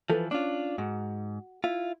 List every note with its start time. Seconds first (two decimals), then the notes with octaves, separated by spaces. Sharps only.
0.10 E3 F3 A4 B4
0.31 C#4 D4 F4
0.78 G#2 F#4
1.64 E4 F4 E5